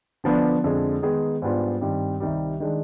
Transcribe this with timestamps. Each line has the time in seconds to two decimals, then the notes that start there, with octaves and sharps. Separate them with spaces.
0.24 D3 F3 B3 D4
0.64 F2 D3 G#3 D4
1.02 D#3 G#3 B3 D#4 G#4
1.42 G#2 G3 B3 D4 F4
1.81 G2 D#3 G3 C4
2.20 C2 C3 D#3 G3
2.60 D#3 G#3 D4